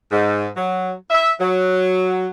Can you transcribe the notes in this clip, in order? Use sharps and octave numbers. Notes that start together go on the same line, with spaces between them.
G#2
F#3
E5
F#3